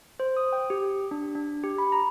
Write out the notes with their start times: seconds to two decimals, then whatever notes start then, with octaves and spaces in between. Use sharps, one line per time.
0.20 C5
0.37 D#6
0.53 G5
0.70 G4
1.11 D4
1.35 D4
1.64 G4
1.78 B5
1.92 A#5